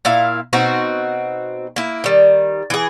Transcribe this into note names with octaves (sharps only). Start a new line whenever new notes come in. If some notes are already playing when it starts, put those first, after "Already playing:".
A#2 E4 F5
B2 C4 D#4 F#4
A#3 E4
D#3 G3
E3 G#4